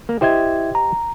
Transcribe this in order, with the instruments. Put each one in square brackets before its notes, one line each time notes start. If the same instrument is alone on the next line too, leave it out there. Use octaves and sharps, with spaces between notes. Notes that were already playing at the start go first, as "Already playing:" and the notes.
[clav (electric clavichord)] A#3
[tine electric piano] E4 E5 G#6 [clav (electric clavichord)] G4 C5 D#5
[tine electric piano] A#5